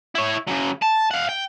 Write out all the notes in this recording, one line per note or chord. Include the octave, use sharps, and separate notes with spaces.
E4 C#5
C#3 F#3
A5
F5 F#5
G5